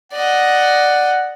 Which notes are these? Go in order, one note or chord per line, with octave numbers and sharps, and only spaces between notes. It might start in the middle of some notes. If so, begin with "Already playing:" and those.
D5 D#5 F#5